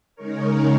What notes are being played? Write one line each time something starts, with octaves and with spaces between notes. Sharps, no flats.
C#3 G#3 D#4 A#4 C#5